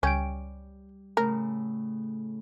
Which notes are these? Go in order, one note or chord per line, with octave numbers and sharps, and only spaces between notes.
C#2 G3 C#4 G5 D7
A2 C#3 A3 A#4